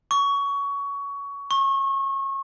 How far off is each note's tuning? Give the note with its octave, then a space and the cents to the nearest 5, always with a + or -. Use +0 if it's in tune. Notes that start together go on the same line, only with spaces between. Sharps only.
C#6 +20
C#6 -30